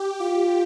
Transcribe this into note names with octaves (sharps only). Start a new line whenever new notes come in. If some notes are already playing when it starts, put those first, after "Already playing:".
Already playing: G4
F4 G4